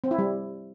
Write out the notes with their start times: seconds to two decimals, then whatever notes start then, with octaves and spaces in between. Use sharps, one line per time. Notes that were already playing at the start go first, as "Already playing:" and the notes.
0.04 C4
0.11 E4
0.18 G3